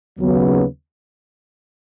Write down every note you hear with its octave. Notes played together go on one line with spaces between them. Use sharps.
D#2 C#3 F#3 B3